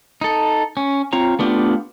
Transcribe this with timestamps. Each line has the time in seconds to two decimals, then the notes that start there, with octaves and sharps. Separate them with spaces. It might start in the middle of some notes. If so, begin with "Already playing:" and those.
0.21 D#4 A4
0.77 C#4
1.13 C4 F4 C#5 A#5
1.39 A3 B3 D4 F4 G4